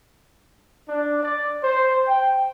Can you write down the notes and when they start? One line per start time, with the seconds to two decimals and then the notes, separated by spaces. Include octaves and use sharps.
0.89 D4
1.23 D5
1.63 C5
2.08 G5